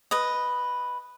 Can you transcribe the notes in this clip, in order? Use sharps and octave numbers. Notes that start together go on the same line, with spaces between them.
B4 D#5